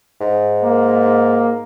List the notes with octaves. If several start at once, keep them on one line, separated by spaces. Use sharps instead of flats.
G#2
A#3